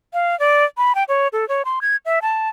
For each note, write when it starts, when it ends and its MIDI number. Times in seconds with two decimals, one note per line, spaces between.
0.14 0.38 77
0.40 0.64 74
0.78 0.95 83
0.95 1.04 79
1.08 1.28 73
1.33 1.47 69
1.49 1.63 73
1.65 1.79 84
1.82 1.96 92
2.06 2.19 76
2.22 2.49 81